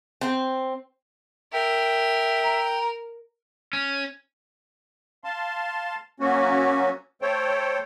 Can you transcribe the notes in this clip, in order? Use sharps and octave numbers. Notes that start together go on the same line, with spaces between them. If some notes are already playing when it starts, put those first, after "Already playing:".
C4
A#4 E5 G5
A#5
C#4
F5 A5 C6
F#3 A#3 C#4 F#4
A3 A4 C5 C#5 G5